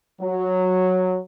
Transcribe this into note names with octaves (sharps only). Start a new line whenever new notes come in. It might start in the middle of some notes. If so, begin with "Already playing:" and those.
F#3